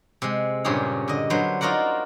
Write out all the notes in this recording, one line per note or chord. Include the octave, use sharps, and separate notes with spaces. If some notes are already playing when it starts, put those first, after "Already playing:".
C3 G#3
G2 A#2 C#3 G4 G#4 C#5
D3 D#5
D3 F#3 B4 C5
D#4 F4 F#4 A#4 D5 F#5